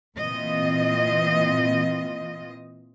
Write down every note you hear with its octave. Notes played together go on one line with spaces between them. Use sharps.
A#2 E3 C4 F4 D#5